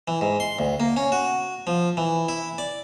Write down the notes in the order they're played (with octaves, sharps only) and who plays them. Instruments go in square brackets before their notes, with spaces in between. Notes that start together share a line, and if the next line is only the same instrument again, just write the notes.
[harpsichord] E3
G#2
C6
D2
A#3
C#4
F#4
F3
E3
E4
D5